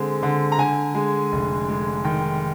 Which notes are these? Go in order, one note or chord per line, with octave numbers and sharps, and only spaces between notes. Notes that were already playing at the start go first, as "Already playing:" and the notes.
Already playing: D3 G#3 C4
D3
A#5
D3 G#5
G#3
F1
G#3
D#3 G5